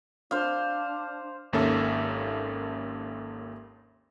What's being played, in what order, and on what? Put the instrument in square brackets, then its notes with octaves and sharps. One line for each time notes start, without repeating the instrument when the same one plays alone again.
[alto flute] D4 [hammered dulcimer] C5 F5
[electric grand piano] G#1 D#2 A#3 C#4 A4 E5